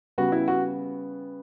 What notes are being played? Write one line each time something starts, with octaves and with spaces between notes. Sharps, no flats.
C#3 G3 B3 F#4
E4
F#4